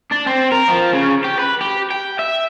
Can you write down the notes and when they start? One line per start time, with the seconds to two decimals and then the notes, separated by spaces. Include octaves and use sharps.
0.11 D4
0.26 C4
0.52 A#4
0.68 F3
0.93 C#3
1.24 G4
1.39 B4
1.61 G4
1.90 G5
2.19 E5